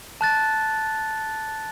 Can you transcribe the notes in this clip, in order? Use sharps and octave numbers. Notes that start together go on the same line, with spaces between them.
A5 F#6 A6